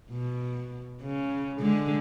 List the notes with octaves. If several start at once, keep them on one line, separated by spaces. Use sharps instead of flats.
B2
C#3
D3 G#3